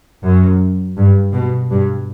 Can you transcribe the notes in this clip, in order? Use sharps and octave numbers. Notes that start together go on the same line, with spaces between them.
F#2
G2
B2
G2